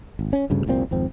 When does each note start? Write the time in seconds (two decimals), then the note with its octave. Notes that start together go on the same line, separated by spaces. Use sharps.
0.19 G#1
0.33 C#4
0.50 D2 G2 C#3
0.67 F1 C2 A#2 C4
0.91 G#1 F2 C4